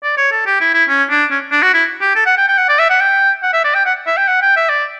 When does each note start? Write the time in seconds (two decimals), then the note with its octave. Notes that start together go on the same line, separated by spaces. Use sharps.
0.03 D5
0.17 C#5
0.32 A4
0.46 G4
0.61 E4
0.74 E4
0.89 C#4
1.10 D4
1.31 C#4
1.52 D4
1.62 F#4
1.74 E4
2.01 G4
2.16 A4
2.26 F#5
2.38 G5
2.48 G5
2.58 F#5
2.69 D5
2.79 E5
2.90 F#5
3.01 G5
3.43 F#5
3.54 E5
3.65 D5
3.75 G5
3.86 F#5
4.07 E5
4.17 G5
4.28 F#5
4.42 G5
4.57 E5
4.70 D5